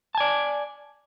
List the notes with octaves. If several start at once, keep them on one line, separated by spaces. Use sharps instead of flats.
D5 G#5 A5